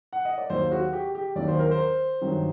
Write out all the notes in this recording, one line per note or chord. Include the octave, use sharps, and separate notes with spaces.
F#5
D#5
D5
D#2 D#3 F#3 C5
F#4
G4
G4
D#2 D#3 F#3 D5
C5
A#4
C5
G2 D#3 F#3